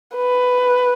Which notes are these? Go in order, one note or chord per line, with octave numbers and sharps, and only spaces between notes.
B4